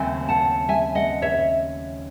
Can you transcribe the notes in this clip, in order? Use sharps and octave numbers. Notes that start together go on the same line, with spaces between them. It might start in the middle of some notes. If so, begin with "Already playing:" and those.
Already playing: D#2 C#3 F#3 A3 C4 G#5
F#5 A5
E5 G#5
D#5 F#5
C#5 E5